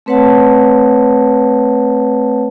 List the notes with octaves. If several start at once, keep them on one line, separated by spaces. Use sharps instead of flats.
A3 C4 B4 C#5 F#5 A5